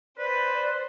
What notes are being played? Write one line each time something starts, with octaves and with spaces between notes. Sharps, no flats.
B4 C5 D5